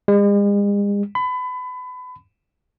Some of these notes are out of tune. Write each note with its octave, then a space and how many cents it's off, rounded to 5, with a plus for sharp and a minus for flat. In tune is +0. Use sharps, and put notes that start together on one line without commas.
G#3 -45
B5 +30